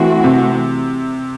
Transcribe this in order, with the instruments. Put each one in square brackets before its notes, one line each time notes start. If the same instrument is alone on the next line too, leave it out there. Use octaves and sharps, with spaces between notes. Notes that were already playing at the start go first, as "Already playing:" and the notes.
Already playing: [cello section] E3 A3 C4 F#4
[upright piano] C3